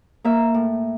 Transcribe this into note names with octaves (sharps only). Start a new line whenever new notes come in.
A#3 E5
A2